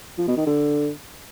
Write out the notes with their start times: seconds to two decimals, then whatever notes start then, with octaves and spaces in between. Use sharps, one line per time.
0.18 F3
0.28 B2
0.37 D#3
0.46 D3